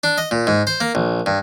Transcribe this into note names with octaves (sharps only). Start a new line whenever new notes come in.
D4
D#5
A#2
G#2
C5
A#3
A#1
G2